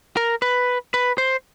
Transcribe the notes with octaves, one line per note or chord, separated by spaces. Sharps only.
A#4
B4
B4
C5